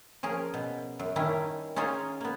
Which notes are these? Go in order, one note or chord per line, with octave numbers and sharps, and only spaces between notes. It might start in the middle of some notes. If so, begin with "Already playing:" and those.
F3 C#4 G#4 A#4
B2
F#2
D#3 G3 C#4 D4 E4
C#4 D#4 F4 G#4 C5 C#5
A#3 B3